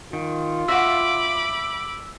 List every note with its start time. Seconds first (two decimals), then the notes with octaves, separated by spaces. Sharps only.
0.13 D#3 F4
0.68 F#4 E5 F#5 B5 D6